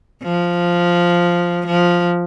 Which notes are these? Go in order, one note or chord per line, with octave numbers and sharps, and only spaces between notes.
F3
F3